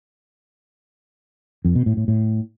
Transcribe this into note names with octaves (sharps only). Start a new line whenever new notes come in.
F2
B2
A2
A2
A2